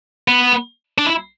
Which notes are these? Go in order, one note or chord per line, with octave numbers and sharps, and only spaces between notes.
B3
D4
E4